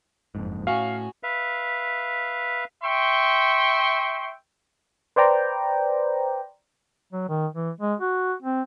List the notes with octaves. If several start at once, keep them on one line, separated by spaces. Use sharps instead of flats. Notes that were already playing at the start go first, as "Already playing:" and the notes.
F#1 F2 G#2
A2 C#4 F#4 G#4 F5
B4 E5 F5
E5 G5 C6 C#6
B4 C5 D5 G5 A#5
F#3
D#3
E3
G#3
F#4
C4